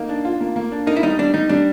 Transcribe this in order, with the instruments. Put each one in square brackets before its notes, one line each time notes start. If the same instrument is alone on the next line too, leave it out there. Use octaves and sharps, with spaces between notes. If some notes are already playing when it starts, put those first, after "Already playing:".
Already playing: [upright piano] A#3 [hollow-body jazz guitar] D#4
[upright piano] D4
F4
A#3
A#3
D4
[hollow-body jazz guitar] D#4 [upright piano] A#4
[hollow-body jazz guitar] E4
[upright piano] G3 [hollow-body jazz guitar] D#4
[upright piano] G3 [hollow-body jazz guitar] D4
[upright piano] G3 [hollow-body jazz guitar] D#4
[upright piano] G3 [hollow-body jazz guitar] D4